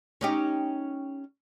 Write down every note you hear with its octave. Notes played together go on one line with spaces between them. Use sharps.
C#4 D#4 G4